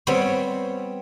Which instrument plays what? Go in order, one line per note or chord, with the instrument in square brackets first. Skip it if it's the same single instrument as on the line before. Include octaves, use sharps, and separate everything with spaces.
[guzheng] G3 B3 C4 C#5